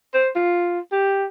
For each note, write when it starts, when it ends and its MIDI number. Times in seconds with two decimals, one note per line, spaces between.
0.14 0.29 72
0.36 0.79 65
0.92 1.26 67